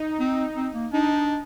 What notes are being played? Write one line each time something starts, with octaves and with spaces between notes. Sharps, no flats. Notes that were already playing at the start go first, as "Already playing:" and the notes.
Already playing: D#4
C4
C4
A#3
D4 D#4